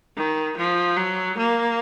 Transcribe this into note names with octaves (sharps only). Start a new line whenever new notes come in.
D#3
F3
F#3
A#3